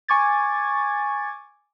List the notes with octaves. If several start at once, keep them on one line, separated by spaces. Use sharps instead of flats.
G#5 C#6 D6 G#6 A6